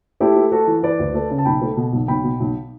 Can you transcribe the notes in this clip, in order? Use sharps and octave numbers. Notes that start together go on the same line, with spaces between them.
A3 E4 G4
A3
A3 F#4 A4
E3
E3 B4 D5
D2
A3
C#3
A5
B1 G5 B5
A3
B2
B1
B1 G5 B5
B2
B1